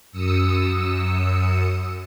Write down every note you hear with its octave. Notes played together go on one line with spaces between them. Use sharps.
F#2 D#6 E6 C#7